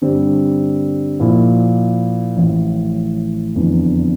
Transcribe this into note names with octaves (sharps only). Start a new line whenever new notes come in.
G2 D3 G3 C4
A#2 F3 A#3 E4
A1 A2 F3
F1 E2 D3